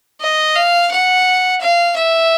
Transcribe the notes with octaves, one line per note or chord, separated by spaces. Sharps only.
D#5
F5
F#5
F5
E5